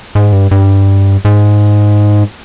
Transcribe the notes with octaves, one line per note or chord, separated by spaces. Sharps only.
G#2
G2
G2
G#2